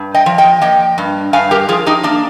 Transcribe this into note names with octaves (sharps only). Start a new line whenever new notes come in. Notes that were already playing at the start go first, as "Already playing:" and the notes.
Already playing: G2
D#5 G5
F3
D#5 G5
A#3 D#5 G5
G2
G2 F5 G#5
G4 A#4
F3 F4 G#4
D#4 G4
A#3 D4